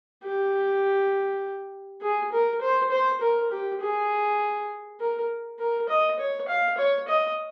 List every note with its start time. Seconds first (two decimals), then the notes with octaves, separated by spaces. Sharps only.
0.24 G4
2.02 G#4
2.32 A#4
2.61 C5
2.91 C5
3.21 A#4
3.52 G4
3.81 G#4
5.00 A#4
5.59 A#4
5.89 D#5
6.19 C#5
6.48 F5
6.78 C#5
7.08 D#5